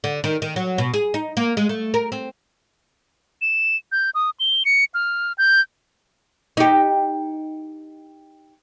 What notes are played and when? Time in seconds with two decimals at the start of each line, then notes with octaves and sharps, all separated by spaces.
0.04 D3
0.24 D#3
0.42 D#3
0.56 F#3
0.78 B2
0.94 G#4
1.14 D#4
1.37 A#3
1.57 G#3
1.69 A3
1.94 A#4
2.12 C4
3.41 E7
3.92 G6
4.15 D#6
4.40 G7
4.65 C#7
4.94 F6
5.38 G6
6.57 D#4 G4